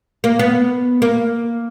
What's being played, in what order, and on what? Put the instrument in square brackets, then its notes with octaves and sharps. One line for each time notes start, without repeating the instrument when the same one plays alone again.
[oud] A#3
B3
A#3